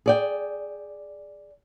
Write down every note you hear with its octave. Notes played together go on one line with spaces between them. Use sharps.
G#4 D5 G5